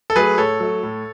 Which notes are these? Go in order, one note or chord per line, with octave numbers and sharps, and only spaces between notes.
A4
F#3 A3 G#4 B4
A2 A4 C#5
F#3 A3
A2